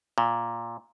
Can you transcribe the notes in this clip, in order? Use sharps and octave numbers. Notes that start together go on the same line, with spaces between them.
A#2